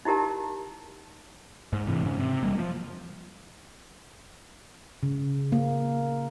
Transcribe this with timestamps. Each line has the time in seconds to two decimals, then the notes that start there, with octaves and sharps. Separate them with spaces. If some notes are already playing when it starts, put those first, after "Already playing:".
0.05 D#4 E4 G4 A#4 A5
1.73 G#2
1.87 C3 E3
2.03 G#2 C#3
2.19 C3
2.43 F1 G3 A#3
2.58 F3
5.03 C#3
5.52 A#3